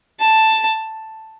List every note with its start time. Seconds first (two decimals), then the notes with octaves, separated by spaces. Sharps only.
0.20 A5